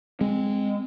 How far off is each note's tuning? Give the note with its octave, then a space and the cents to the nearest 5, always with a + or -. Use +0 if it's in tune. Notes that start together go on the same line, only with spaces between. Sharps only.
G#3 -10 C4 +0